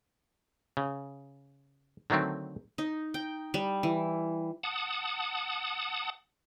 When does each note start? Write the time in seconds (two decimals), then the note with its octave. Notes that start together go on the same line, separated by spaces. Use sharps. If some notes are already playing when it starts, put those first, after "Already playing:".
0.77 C#3
2.10 D3 D#3 F#3 A3 C4
2.78 D#4
3.14 G5
3.54 G3
3.83 E3
4.63 F#5 A5 D#6